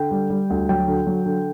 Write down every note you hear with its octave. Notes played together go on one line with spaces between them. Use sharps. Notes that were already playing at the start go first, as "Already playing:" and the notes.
Already playing: D3 G5
G3
G3
D2
F#3 G5
D3
F#3
D3